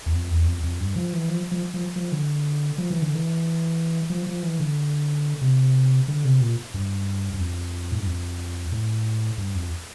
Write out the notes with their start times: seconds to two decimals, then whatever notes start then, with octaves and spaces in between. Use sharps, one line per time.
0.06 E2
0.14 F2
0.30 E2
0.47 F2
0.63 F2
0.80 G2
0.96 F3
1.13 E3
1.29 F3
1.51 F3
1.74 F3
1.96 F3
2.12 D3
2.78 F3
2.90 E3
3.02 D3
3.15 E3
4.10 F3
4.26 F3
4.43 E3
4.60 D3
5.41 C3
6.08 D3
6.25 C3
6.41 A#2
6.74 G2
7.34 G2
7.40 F2
7.92 A2
7.99 G2
8.06 F2
8.72 A2
9.38 G2
9.55 F2